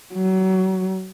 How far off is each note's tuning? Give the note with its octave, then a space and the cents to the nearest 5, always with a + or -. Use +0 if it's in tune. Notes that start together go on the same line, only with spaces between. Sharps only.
F#3 +30